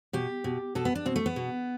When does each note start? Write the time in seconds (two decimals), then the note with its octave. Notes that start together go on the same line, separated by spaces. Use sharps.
0.13 B2 G4
0.44 B2
0.75 B2 A4
0.85 B3
0.95 D4
1.06 B2 C4
1.16 A3
1.26 B3
1.36 B2